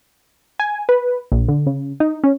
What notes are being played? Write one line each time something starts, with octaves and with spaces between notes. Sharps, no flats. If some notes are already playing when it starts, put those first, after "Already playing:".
G#5
B4
A#1
D3
C#3
D#4
C#4